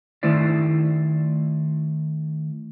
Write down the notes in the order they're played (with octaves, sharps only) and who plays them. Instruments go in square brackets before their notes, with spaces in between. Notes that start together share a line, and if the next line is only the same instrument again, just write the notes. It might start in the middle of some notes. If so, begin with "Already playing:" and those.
[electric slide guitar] D#3 A3 E4 C5 D5